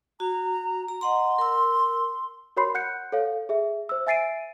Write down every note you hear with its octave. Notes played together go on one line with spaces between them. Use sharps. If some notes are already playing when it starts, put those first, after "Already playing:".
F#4 A#5
A#5
D#5 F#5 A#5 C6
A#4 E6
F#4 A#4 C#5 B5 C6 C7
F#5 F#6 G6 C#7
A4 C#5 F5
G#4 E5
C5 E6
E5 G#5 A6 C7 D7 D#7